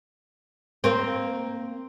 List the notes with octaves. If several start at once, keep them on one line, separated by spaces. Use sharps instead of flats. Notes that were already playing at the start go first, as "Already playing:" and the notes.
A#3 C4